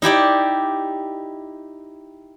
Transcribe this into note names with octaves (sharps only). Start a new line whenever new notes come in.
D#4 E4 G4 D5